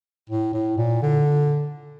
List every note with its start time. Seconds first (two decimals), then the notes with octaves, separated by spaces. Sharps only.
0.29 A2
0.53 A2
0.78 A#2
1.02 D3